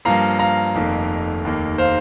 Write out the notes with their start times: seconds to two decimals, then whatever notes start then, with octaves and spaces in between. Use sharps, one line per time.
0.05 G2 F3 A#3 F5 A#5
0.39 F5 A#5
0.75 F1 F2 D#3 A#3
1.44 F1 D#2 D#3 A#3
1.78 C5 F5